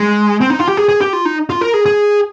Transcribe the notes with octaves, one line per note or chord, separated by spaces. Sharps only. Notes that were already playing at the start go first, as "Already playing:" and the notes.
Already playing: G#3
C4
D#4
F4
G4
G#4
G#4
G4
F4
D#4
F4
A#4
G#4
G#4